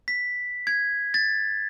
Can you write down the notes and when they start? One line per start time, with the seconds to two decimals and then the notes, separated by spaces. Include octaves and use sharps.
0.08 B6
0.67 G#6
1.14 A6